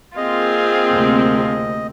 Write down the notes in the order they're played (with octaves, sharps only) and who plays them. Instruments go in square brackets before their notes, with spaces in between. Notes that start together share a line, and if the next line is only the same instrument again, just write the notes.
[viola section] A#3 C4 [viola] F4 G#4 [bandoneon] D#5
[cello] D2 C3